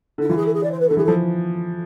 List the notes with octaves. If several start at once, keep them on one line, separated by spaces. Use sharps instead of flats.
D3 E4
E3 F4
G#4
A4
G#4
D5
C5
B4
D3 A4
E3 G#4
F3 A4